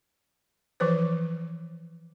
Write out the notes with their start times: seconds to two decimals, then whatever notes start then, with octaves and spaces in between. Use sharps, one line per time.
0.80 E3 F3 B4 C5